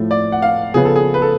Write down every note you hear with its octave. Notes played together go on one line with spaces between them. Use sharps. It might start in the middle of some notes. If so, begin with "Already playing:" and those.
Already playing: A2 F3 A3
D5
F#5
F5
C#3 F3 B3 G#4
A4
G#4
B4
A4